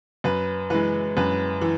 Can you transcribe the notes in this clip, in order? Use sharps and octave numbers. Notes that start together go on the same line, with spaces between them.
F#2 B4
E3 G#3 B4
F#2 B4
E3